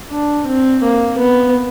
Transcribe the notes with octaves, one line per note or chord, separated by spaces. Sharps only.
D4
C4
A#3
B3